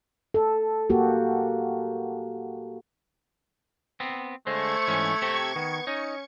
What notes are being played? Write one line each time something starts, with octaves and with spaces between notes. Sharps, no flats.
A4
A#3 F#4 G4
B3 C4
D3 G#3 A3 C5 C#6 G#6 C#7
G#2 E3 C#4
C3 C4 G4 A4
D#3 B3
C#4 D#4